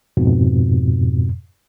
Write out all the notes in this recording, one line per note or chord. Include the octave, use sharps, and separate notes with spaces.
F2 G#2 B2